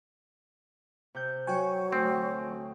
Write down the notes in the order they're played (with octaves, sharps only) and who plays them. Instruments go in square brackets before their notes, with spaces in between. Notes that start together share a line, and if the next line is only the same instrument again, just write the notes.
[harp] C3 G6
[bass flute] F#3 [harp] F#4 C#6 [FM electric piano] C#5 G5 G#5
[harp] D2 [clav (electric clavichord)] C4